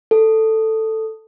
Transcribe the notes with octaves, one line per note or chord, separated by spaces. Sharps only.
A4